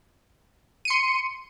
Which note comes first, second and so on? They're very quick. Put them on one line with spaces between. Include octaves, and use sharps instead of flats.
D#7 C#7 C6